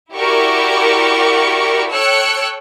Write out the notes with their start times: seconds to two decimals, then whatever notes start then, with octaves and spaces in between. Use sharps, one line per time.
0.13 E4 F#4 G4 A#4 D5 C#6
1.90 A4 C#5 G5 E6 F#6 C#7